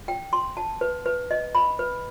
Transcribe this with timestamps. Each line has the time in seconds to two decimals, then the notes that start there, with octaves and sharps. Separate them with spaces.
0.08 G5
0.33 C6
0.57 A5
0.81 B4
1.06 B4
1.31 D#5
1.55 B5
1.79 B4